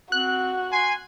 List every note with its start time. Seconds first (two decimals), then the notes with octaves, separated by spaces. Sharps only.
0.12 C4 F#4 F#6
0.72 G#5 C6